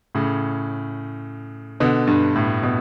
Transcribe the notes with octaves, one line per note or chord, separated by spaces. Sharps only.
A2 C#3
B2 D3
G2
A2
B2